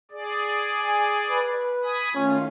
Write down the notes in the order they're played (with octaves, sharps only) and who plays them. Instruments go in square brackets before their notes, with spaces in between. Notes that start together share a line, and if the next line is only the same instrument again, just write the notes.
[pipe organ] G#4 D5
[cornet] G#5
B4
[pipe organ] G#5 B5 D#6
[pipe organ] D#3 A3 F4 [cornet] C#4